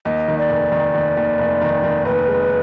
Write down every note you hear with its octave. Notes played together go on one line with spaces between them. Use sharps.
D#2 D#5
D#3
D5
F1
D#3
D#2
D#2
F1
D#3
D#3
F1 B4
G#3